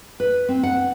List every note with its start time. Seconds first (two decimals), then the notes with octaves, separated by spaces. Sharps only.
0.20 B4
0.49 C4
0.63 F#5